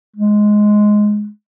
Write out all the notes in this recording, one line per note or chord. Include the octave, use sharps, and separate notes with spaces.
G#3